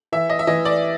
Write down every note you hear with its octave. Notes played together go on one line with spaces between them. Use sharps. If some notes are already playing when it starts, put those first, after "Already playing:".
E3 E5
D#5
E5
E3 D#5
D5